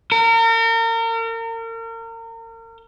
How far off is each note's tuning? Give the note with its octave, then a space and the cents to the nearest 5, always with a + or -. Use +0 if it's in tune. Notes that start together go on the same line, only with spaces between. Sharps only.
A#4 -35